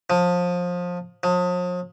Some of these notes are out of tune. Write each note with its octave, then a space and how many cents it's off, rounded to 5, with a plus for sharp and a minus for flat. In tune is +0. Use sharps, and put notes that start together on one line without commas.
F3 +25
F3 +45